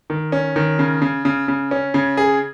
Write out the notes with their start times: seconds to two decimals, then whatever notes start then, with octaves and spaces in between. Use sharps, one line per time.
0.10 D#3
0.32 C#4
0.56 D#3
0.79 C#3
1.02 C#3
1.25 C#3
1.48 C#3
1.71 C#4
1.94 C#3
2.17 G#4